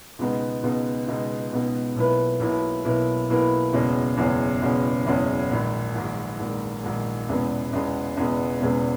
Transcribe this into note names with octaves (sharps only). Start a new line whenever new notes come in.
C#2 B2 G#3 B3 D#4
C#2 B2 G#3 B3 D#4
C#2 B2 G#3 B3 D#4
C#2 B2 G#3 B3 D#4
B1 B2 A#3 E4 B4
B1 B2 A#3 E4 B4
B1 B2 A#3 E4 B4
B1 B2 A#3 E4 B4
F#1 E2 B2 G#3 C#4
F#1 E2 B2 G#3 C#4
F#1 E2 B2 G#3 C#4
F#1 E2 B2 G#3 C#4
A#1 G#2 D#3
A#1 G#2 D#3
A#1 G#2 D#3
A#1 G#2 D#3
E1 E2 C#3 G#3 B3
E1 E2 C#3 G#3 B3
E1 E2 C#3 G#3 B3
E1 E2 C#3 G#3 B3